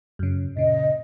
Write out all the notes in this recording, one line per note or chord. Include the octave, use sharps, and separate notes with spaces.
F#2 C#3
A#2 C#3 D#5